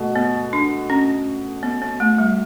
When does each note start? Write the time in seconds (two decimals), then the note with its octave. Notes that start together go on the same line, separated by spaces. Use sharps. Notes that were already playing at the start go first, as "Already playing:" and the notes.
Already playing: B2 A3
0.16 B3
0.53 D4
0.90 C#4
1.63 B3
1.82 B3
2.00 A3
2.18 G3